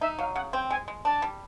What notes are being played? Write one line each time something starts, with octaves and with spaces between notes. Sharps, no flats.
D#4 E5
F#3 F5
C#3 F#5
C4 G5
G#3 G#5
G#3
D4 A5
G3